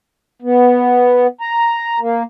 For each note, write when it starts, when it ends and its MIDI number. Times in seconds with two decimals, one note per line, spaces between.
0.42 1.27 59
1.41 1.99 82
2.00 2.23 58